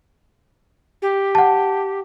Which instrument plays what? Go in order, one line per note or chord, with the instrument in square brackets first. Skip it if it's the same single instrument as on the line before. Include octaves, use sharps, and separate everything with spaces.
[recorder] G4
[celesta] F#5 A5